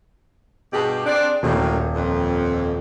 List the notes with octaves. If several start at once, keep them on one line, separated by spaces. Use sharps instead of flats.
G2 B2 G4 G#4
C4 D4
D#1 F#2 A2 C3
F2